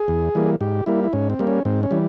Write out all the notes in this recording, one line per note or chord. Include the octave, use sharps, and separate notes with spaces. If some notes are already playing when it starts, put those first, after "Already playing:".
Already playing: G#4
E2
E3 G3 A#3
G#2 G4
G3 A#3 E4
E4
G#2 C#4
C4
G3 A#3
C#4
G#2 C4
C#4
E3 G3